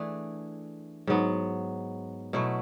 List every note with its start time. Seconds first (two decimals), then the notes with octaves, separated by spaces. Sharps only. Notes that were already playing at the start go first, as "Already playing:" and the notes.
Already playing: E3 A3 D4 G#4
1.07 G#2 F#3 B3
2.33 B2 F#3 A3 E4